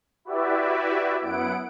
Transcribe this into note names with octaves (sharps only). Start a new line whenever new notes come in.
E4 F#4 G4 B4 D5 E5
F#2 B3 E4 F#5 D7